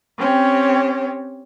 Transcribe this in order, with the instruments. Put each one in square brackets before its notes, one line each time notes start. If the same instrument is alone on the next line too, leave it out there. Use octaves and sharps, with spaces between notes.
[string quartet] C4 C#4 G4 C#5